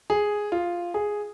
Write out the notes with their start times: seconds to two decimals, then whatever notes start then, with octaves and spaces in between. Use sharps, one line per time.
0.10 G#4
0.52 F4
0.94 G#4